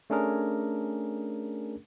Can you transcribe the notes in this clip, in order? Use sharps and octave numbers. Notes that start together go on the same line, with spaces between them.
A3 C#4 D4 G#4 A#4